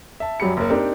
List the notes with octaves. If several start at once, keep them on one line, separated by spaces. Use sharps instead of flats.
E5 A5
F#2 F#3 G3 G4 B5 C#7
F#1 A#3
C4 D4 D#4 G4 A#4 C5